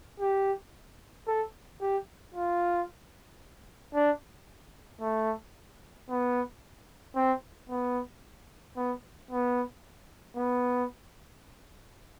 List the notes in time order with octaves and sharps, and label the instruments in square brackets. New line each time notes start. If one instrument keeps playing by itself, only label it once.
[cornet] G4
A4
G4
F4
D4
A3
B3
C4
B3
B3
B3
B3